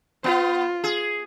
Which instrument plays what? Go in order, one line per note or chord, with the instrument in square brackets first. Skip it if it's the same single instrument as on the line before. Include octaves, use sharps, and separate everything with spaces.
[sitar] B3 [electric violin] F4
[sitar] G#4